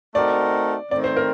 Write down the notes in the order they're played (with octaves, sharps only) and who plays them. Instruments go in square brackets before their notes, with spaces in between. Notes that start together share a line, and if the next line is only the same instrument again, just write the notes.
[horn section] A3 C4 D#4 F#4 A#4 [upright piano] D5
[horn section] D#3 A3 C4 [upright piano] D5
[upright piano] C5
A#4